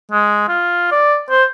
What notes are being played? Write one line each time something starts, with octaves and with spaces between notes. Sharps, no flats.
G#3
F4
D5
C5